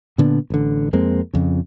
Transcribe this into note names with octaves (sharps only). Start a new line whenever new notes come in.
A#2 D3 B3 D4
A1 D3
F2 G#3 A#3 C4
F2 C#3